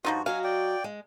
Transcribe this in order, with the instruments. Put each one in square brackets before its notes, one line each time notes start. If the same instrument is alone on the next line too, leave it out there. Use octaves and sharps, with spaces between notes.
[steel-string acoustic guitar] G2 [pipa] F3 D#4 F4 [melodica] F#4
[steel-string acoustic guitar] F#3 F#4 D#5 [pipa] F5 [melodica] G#5
[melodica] D5 G5
[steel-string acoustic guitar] G#3